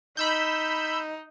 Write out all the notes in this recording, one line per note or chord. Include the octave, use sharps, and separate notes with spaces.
D#4 B5 E6 G6